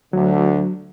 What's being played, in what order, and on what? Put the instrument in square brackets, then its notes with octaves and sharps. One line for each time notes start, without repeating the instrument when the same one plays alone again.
[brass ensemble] D2 D3 [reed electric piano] F#3